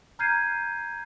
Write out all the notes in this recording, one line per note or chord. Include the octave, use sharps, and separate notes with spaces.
A#5 F6 G6 G#6 C7 D#7